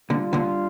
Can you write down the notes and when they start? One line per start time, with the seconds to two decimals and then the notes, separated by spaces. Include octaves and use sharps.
0.10 A#2 D3 G3 D4 F4
0.33 A#2 D3